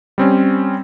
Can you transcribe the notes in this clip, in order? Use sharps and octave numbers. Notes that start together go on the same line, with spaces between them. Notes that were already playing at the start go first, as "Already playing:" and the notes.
G3 C4 C#4